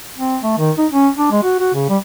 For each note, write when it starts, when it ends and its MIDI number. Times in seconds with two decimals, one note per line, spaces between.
0.17 0.38 60
0.43 0.53 57
0.58 0.71 51
0.78 0.86 63
0.91 1.09 61
1.18 1.29 62
1.31 1.43 56
1.43 1.58 66
1.60 1.69 66
1.74 1.88 49
1.89 1.97 55